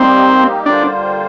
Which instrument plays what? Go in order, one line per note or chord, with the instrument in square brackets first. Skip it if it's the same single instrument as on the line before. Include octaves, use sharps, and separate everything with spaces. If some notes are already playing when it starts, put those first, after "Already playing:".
Already playing: [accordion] G3 A#3 D#4 G4 [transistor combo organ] C4
[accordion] D3 G3 A#3 F4 C5 [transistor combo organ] D4